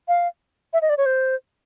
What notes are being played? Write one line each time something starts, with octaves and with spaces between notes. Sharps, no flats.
F5
E5
D#5
D5
C#5
C5